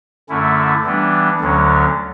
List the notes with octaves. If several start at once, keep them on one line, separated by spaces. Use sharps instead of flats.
F#2 D3 A3 C#4 E4
E3 G3 B3 D4
D2 D3 F#3 C#4